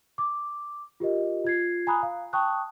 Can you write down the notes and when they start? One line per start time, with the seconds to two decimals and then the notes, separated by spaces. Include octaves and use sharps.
0.18 D6
1.00 F4 G4 A#4 D#5
1.44 F4 G#6 C7
1.87 G#5 A#5 B5 D#6 F#6
2.03 F5
2.33 G5 A5 C#6 D#6 F#6